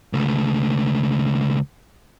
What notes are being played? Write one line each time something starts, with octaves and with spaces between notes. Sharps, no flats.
C#2 A3